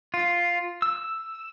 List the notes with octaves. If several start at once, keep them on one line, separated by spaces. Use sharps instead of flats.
F4
E6